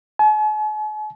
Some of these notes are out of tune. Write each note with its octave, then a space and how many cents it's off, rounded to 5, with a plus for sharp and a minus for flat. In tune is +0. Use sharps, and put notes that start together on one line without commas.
G#5 +45